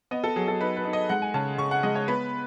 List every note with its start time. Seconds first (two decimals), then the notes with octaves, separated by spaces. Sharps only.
0.11 B3 D#5
0.24 A4
0.36 F#3 G#4
0.48 A4
0.60 D#4 B4
0.77 B4
0.85 D#4
0.93 D#5
1.09 G#3 F#5
1.22 G#5
1.34 C#3 A5
1.58 C#3 C#6
1.71 F#5
1.83 G#3 D#5
1.95 C#5
2.08 B3 B4